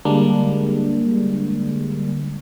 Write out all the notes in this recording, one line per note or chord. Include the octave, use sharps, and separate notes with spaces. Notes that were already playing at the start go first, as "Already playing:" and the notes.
D3 G3 G#3 A#3 D4